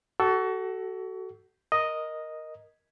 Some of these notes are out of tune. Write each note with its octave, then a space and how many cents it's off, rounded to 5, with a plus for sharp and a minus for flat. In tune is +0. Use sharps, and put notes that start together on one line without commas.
F#4 +30 A4 +0
A#4 +5 D#5 +0